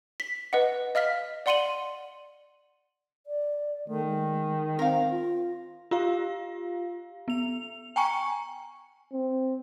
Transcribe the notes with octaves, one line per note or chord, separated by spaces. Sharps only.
B6
B4 D#5 F#5
D#5 F5 F6 B6
D5 F#5 C6 C#7 D#7 F#7
D5
D#3 A3
G#3
C4 A#4 F5
F4
F4 G4 F5
B3 F7
G5 G#5 A#5 C#6 C#7
C4